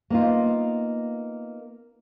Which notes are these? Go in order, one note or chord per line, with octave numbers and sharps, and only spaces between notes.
A#3 B3 D#4 F4